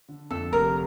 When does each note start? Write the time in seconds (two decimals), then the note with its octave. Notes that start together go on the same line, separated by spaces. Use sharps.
0.09 D3
0.30 F2 A4
0.52 F1 A#4